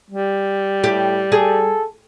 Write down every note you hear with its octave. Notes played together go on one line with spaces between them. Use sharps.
G3
A2 G4
G#4 A4